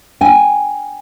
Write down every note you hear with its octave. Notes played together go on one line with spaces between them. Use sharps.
G5 G#5